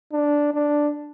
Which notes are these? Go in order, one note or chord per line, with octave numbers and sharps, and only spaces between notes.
D4
D4